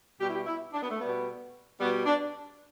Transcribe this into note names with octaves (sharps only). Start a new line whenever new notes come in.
B2 G3 G4
E4
G4
E4
D4
B3
A3
B2 G3 B3
B2 G3 B3
D4